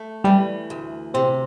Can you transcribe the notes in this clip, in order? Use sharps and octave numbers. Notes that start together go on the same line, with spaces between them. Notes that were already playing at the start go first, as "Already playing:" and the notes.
Already playing: A3
E3 G3
D2
C3 C4